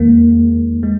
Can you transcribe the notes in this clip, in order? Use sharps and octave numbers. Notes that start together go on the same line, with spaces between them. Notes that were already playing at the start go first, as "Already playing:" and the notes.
Already playing: E2 D#3 G#3 A#3
G#3